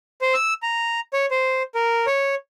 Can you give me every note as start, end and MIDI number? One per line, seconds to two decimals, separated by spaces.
0.21 0.34 72
0.34 0.54 88
0.63 1.00 82
1.13 1.26 73
1.31 1.63 72
1.75 2.06 70
2.07 2.35 73